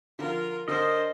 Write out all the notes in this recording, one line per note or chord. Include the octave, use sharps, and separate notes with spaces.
D3 F3 F4 A#4
D3 D4 A#4 C5 D#5